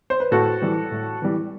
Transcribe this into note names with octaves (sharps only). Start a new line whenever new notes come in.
C5
B4
A2 F#4 A4
E3 G3
A2
E3 G3